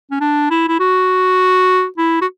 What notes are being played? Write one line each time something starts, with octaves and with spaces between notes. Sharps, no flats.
C#4
D4
E4
E4
F#4
E4
F#4